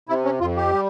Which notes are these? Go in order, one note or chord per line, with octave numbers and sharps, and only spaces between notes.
C3 E4
C#4
F2 F4
G4
G3